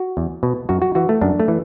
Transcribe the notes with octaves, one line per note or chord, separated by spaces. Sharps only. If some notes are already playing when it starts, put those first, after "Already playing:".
Already playing: F#4
E2
B2
F#2 F#4
F#4
E3 F#4
A3
F#2 D4
A3
E3